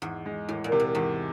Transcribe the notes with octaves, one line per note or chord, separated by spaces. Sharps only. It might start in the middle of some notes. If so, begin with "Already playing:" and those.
E2 G#2
G#3
A2 E3
A#2
C3
A#2
E2 G#2